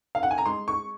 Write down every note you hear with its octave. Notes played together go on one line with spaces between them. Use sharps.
F5
F#5
G#5
A#5
G#3 C6
C#6